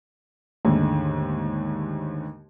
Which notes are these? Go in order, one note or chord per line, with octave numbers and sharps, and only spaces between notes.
D#2 G#2 D3 G#3 A3